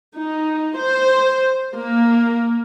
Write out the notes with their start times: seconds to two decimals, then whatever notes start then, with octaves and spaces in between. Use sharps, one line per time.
0.16 D#4
0.76 C5
1.73 A#3